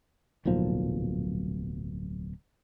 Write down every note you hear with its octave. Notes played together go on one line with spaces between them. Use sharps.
D1 B1 A#2 F3